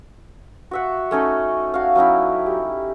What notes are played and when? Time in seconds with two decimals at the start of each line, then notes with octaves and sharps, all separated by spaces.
0.71 F#4 E5 F#5
1.11 A3 C#4 D#4 A4
1.74 F#4 F5
1.95 F#3 C#4 D#4 E4
2.46 G4